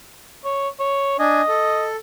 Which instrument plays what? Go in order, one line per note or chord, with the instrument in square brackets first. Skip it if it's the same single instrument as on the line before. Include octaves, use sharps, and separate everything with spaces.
[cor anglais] C#5
C#5
[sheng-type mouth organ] D4 G#5 [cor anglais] D#5
[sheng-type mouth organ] A4